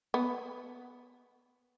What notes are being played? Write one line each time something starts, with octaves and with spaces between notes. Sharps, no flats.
B3